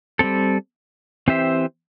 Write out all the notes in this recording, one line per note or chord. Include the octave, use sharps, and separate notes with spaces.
G3 C4 A4
E3 C4 G4 C5 E5